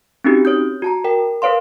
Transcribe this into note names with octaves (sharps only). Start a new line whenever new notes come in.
C4 C#4 D#4 E4 F#4 G4
C#5 D#6 G6
F#4 A5 A#5
A#4 G5
A#4 B4 C#5 F5 C6